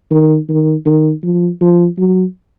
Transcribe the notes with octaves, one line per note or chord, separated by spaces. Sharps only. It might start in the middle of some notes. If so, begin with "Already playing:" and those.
D#3
D#3
D#3
F3
F3
F#3